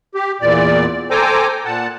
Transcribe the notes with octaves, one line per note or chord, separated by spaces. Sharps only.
G4
E2 A#2 D5
A4 C5 G5 G#5 A#5 D6
A#2 F#5 A5